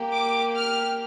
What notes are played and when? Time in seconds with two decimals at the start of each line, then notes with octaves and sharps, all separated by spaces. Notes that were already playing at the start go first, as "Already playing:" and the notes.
Already playing: A#3 G4
0.11 D6
0.56 F6